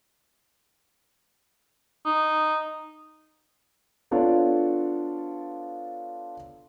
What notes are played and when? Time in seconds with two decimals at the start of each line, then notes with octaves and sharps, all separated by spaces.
2.06 D#4
4.11 B3 D4 F4 A4 C#5 D5